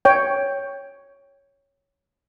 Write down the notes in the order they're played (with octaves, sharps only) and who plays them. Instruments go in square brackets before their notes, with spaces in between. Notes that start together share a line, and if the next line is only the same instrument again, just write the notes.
[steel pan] C#5 G5